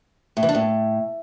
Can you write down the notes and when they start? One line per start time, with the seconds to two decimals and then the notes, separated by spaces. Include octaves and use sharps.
0.37 A2
0.43 E3
0.49 D4
0.55 A2